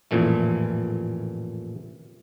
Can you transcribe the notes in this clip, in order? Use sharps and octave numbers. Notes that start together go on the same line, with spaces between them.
A1 F2 A#2 E3 A3